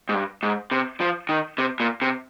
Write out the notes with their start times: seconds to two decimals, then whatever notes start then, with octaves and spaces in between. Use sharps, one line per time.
0.09 G#2
0.14 G2
0.43 G#2
0.71 C3
1.00 F3
1.29 D#3
1.58 C3
1.80 A#2
2.02 C3